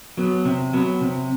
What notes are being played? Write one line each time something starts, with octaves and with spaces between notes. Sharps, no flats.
F#3 B3
C3
F#3 B3
C3